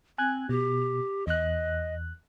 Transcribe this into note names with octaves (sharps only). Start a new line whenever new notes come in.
C4 G#5 F#6 G#6
B2 G4
E2 D#5 F#6